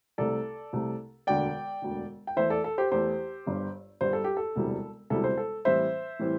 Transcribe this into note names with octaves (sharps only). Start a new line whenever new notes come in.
C2 C3 A3 A4 D5
C2 C3 A3
E1 D2 D3 D5 G5
E1 D2 D3
G5
E2 E3 A3 E4 C5 E5
A4 D5
A4
G4 C5
E2 E3 A3 E4 G4 C5
G1 G2 G3
G1 G2 G3 C5
A4
G4
A4
E1 D2 C3 G3 E4
E1 D2 C3 G3 E4 A4
C5
A4
A2 E3 G3 C4 E4 C5 E5
A2 E3 G3 C4 E4